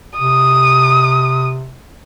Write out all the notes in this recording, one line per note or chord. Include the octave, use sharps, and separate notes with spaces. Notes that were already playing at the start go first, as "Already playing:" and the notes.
C3 D#6